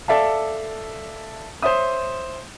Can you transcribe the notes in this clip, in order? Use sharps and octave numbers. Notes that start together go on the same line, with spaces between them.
A4 D5 E5 F5 A5
C5 C#5 E5 D#6